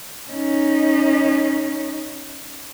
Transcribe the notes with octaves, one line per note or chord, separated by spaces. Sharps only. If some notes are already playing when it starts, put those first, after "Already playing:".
C#4 D#4